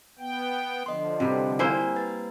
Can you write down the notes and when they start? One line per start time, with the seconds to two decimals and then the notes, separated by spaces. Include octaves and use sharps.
0.19 B3 G5
0.86 D3 F3 D#5 C6
1.20 C3 G3 B4
1.59 A#3 E4 C5 G#5
1.96 B4 A6